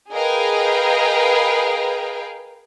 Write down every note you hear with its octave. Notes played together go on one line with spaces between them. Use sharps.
G#4 A#4 B4 D#5 F5 G5